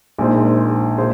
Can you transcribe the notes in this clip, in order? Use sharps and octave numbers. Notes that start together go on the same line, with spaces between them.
A#1 A#2 G#3 D#4 C5
A#2 F4 G#4 C5